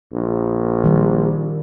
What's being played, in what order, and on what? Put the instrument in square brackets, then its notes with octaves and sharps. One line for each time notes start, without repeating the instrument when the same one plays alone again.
[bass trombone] A#1
[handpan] D#3 G3